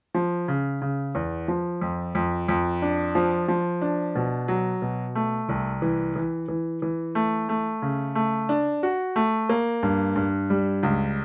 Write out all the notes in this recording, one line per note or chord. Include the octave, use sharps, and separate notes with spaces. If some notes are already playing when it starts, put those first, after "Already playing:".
F3
C#3
C#3
E2
F3
F2
F2
F2
D4
F3
F3
D4
B2
F#3
B2
A3
C2
E3
E3
E3
E3
A3
A3
C#3
A3
D4
F#4
A3
A#3
G2
G2
G3
C#2